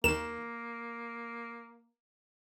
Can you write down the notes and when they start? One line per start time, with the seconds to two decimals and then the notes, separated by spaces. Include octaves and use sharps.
0.04 D#2 D#3 A#3 A#4 E7